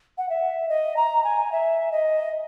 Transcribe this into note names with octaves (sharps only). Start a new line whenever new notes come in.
F#5
E5
D#5
A#5
G#5
E5
D#5